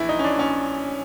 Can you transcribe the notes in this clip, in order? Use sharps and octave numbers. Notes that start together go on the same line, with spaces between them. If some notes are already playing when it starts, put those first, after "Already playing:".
Already playing: A#1 E3 E4
D#4
C#4
D4
C#4